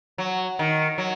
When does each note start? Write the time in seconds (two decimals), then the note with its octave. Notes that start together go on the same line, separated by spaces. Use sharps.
0.18 F#3
0.59 D#3
0.98 F#3